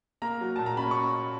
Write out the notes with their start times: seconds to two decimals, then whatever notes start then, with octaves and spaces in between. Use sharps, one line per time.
0.22 A#3 A#5
0.41 F#3
0.56 A#2 A5
0.66 A#5
0.76 C#4 B5
0.91 C#6